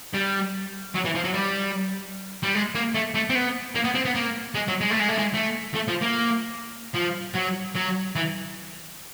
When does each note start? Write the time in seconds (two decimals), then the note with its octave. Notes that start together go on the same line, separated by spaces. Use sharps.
0.14 G3
0.95 F#3
1.05 E3
1.15 F3
1.25 F#3
1.34 G3
2.43 G3
2.55 G#3
2.75 A#3
2.94 A3
3.14 A3
3.30 C4
3.35 B3
3.75 A#3
3.84 B3
3.95 C4
4.05 B3
4.15 A#3
4.55 G#3
4.68 F#3
4.81 G#3
4.91 A3
5.00 G#3
5.09 A3
5.19 G#3
5.34 A3
5.75 A3
5.88 F3
6.01 A#3
6.95 F3
7.35 F#3
7.76 F#3
8.16 E3